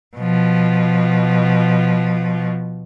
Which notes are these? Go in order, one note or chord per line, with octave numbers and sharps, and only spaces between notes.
B2 F3